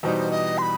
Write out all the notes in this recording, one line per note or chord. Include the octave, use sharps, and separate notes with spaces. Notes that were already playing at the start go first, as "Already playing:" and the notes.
E2 B2 G3 D#4 C5
D#5
C6
B5